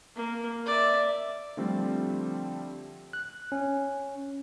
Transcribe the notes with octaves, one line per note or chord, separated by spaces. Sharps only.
A#3
D5 E5
D3 F3 G3 A3 C4
F#6
C#4